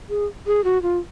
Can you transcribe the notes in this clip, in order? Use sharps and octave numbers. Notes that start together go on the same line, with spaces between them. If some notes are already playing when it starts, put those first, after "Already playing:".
G#4
G#4
F#4
F4